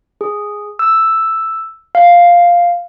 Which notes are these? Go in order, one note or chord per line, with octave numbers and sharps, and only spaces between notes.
G#4
E6
F5